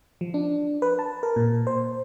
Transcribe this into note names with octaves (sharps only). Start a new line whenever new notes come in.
F3
D4
B4
A5
A#4
A#2
C5